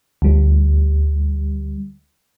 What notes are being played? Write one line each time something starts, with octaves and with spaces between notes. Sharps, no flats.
D2 G3